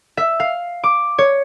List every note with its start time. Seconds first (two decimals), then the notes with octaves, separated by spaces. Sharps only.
0.17 E5
0.40 F5
0.84 D6
1.18 C#5